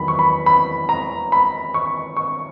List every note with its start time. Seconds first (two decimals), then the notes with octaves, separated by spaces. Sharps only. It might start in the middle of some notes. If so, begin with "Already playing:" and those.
Already playing: E2 D#3 F#3 B5
0.08 C#6
0.19 B5
0.46 B5
0.89 A#5
1.32 B5
1.74 C#6
2.17 C#6